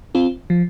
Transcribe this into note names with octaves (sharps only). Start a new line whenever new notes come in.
C4 F4
F3